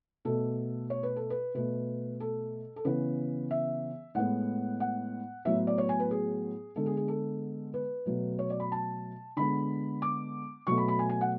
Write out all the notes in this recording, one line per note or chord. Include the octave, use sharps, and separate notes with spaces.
B2 A3 A4
C#5
B4
A4
B4
B2 A3 B4
A4
A4
C#3 E3 B3 B4
E5
A2 G#3 B3 F#5
F#5
A2 F#3 B3 E5
D5
C#5
G#5
B4
G#4
D3 G#3 B3 A4
G#4
G#4
A4
B4
B2 F#3 A3
C#5
D5
B5
A5
D3 G#3 B3 B5
D6
B2 F#3 A3 C#6
B5
B5
G#5
G#5
F#5